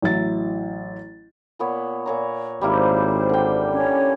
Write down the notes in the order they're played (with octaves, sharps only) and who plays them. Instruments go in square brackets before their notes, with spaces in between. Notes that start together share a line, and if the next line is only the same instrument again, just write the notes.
[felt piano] A1 F#3 E4 A6
[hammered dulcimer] A#2 B3 C#5
A#2 C#5 A#5
[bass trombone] G#1 [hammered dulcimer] G3 A#3 E4 [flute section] C5
[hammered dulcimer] D3 G5
[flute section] C#4 C#5